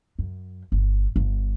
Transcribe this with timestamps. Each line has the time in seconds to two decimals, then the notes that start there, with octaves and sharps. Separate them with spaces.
0.19 F#2
0.72 G1
1.16 G1